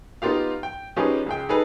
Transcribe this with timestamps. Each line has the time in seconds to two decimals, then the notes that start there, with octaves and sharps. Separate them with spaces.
0.22 B3 D#4 F4 G4 F5
0.63 G5
0.96 F3 C#4 D#4 G4 G#4 B4
1.26 C#2 G#4 G5
1.49 D#4 G#4 A4 B4